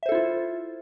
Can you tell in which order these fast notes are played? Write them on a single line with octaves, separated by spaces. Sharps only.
E5 C5 A4 E4 F4